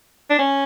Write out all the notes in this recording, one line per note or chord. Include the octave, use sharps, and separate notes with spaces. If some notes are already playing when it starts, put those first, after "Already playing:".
D4
C#4